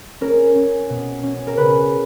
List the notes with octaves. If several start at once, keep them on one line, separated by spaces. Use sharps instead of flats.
C#4 A#4
C#4
B2
C#4
A#4
C#3 B4